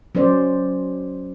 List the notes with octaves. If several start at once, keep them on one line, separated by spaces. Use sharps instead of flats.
F#3 C#4 C5 D5